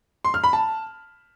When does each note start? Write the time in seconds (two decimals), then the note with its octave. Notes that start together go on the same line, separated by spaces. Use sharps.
0.25 C6
0.34 F6
0.44 B5
0.53 A5